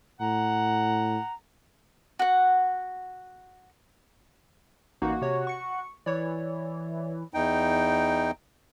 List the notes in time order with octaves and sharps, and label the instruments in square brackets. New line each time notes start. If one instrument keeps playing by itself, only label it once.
[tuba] A2 [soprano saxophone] F#5 [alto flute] A#5
[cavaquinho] F#4 F#5
[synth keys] A1 A#3 D#4 [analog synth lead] F#4
[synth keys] C3 C#5
C#6 C#7
[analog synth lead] E3 [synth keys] C#5 D5
[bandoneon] E2 D#4 G5